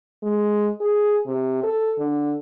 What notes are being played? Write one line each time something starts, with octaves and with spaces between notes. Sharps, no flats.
G#3
G#4
C3
A4
D3